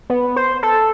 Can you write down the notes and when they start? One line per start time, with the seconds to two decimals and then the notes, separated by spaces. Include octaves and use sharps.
0.10 B3
0.36 C5
0.63 A4